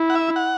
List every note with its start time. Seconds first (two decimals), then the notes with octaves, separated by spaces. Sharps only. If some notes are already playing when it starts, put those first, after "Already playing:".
Already playing: E4
0.10 F#5
0.15 E5
0.36 F#5